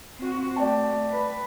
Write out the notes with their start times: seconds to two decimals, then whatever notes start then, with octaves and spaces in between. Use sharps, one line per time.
0.17 C4 F#4
0.56 A3 D5 G5 A5
1.11 B4